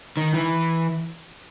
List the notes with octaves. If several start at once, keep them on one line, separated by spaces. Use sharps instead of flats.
D#3
E3